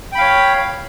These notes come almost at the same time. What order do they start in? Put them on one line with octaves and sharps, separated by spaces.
G5 B5 F5 C#5